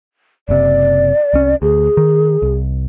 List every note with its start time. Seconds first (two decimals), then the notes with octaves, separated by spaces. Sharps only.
0.49 F#1 C3 D5
1.33 C2 C#4
1.62 D2 G#4
1.97 D#3
2.42 C2